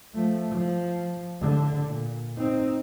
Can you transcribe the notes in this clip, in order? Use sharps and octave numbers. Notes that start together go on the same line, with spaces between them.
F3 A3
F3
A2 D3
A#2
C4 D#4